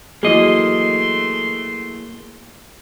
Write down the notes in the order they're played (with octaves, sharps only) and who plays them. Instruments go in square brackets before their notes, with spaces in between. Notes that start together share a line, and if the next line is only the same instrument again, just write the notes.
[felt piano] E3 F#3 [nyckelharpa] A3 C6 [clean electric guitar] A#3 D#5 [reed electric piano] G#4